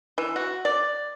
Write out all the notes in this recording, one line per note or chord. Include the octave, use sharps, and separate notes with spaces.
E3
F#4
D5